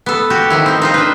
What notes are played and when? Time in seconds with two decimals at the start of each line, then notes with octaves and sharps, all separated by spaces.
0.06 B3 A4
0.30 F#4 G4
0.50 D#3 F3 E4
0.66 C4 D#4
0.82 D#4 F4 C5
0.94 D4 B4